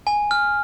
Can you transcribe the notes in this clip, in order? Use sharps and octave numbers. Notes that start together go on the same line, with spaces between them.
G#5
F6